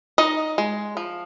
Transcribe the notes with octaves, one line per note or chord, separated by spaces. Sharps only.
D#4 D#5
G#3
F3